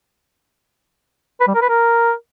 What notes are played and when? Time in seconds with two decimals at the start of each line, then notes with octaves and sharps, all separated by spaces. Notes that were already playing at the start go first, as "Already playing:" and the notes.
1.41 B4
1.48 G3
1.55 A#4
1.62 B4
1.69 A#4